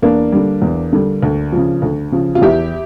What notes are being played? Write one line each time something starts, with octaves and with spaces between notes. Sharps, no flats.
E2 A#3 D4
D3 G3
E2
D3 G3
D2
C#3 F3
D2
C#3 F3
F4
E2 E4 G4